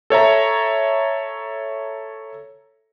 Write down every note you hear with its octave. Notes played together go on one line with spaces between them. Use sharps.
A4 C#5 E5 A#5